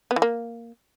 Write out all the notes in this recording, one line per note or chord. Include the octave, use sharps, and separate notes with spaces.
B3
E3
A#3